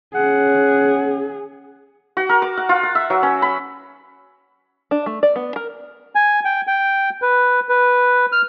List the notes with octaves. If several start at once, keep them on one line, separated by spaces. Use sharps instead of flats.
C#4 G#4 F#5
F#4
A#4
D6
F#5
F4
F#5
E5
F#3
C#4
B5
D4
A3
D5
B3
A#4
G#5
G5
G5
B4
B4
F6